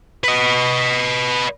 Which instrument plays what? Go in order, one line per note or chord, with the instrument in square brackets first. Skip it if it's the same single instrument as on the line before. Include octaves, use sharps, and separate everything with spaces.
[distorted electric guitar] B4 D#5